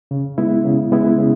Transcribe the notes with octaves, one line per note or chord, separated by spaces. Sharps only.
C#3
G#3 B3 E4
C#3
G#3 B3 E4
C#3